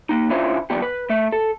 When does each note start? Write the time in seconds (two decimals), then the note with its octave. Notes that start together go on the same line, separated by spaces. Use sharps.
0.09 A#3 D#4
0.29 D3 C#4 E4 F4 C5
0.70 D#3 F3 G3 B3 G4
0.82 B4
1.10 A3 E5
1.32 A4